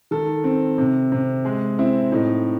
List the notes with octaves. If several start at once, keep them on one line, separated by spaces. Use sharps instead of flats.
D#3 A4
C4
C3
C3
G#3 G#4
C4 E4
A2 D#4